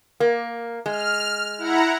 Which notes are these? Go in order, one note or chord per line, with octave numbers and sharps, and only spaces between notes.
A#3
G#3 F6
E4 F#5 A#5